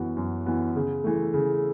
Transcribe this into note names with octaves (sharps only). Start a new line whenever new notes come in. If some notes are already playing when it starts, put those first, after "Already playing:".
Already playing: F#2 E3 B3 F#4
F#2
E3 B3 F#4
C#3
E3 A3
C#3